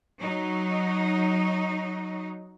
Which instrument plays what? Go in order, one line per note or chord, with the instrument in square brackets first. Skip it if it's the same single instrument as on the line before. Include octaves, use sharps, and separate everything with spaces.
[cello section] F#3 D#4